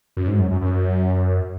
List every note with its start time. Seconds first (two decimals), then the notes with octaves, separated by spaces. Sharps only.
0.17 F#2
0.28 G#2
0.39 F#2
0.51 F#2
0.61 F#2